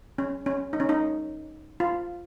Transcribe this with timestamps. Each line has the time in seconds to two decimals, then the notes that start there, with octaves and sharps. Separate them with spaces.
0.18 C#4
0.46 C#4
0.73 D#4
0.80 C#4
0.89 D#4
1.80 F4